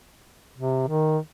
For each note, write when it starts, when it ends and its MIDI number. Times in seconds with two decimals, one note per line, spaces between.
0.57 0.86 48
0.88 1.18 51